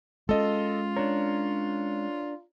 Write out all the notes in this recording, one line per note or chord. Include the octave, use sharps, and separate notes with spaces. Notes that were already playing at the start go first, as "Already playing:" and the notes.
G#3 B3 C#4 F4 A4 D#5
D4 A#4 C#5